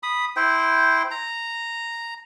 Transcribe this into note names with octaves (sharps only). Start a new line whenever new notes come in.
B5 D#6
E4 C5 G5
A#5